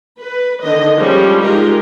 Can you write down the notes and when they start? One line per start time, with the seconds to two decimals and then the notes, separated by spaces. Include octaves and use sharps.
0.19 B4
0.62 D3 D#3 D#5
0.97 F3 G3 G#3 C#4
1.42 G#3 D#4 F4 G4 A#4